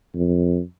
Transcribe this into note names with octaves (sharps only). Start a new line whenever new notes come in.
F2